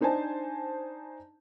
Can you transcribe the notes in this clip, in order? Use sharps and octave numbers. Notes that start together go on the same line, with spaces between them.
D4 D#4 C5 G#5 A5